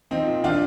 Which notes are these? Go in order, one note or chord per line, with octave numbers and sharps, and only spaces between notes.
F3 C4 D#4
A#2
F3 D4 F4